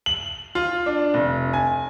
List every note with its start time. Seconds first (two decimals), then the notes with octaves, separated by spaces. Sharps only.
0.06 F#7
0.55 F4
0.86 D4
1.14 F1
1.53 G#5